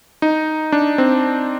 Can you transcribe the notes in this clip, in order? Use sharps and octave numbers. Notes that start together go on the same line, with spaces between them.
D#4
D4
C4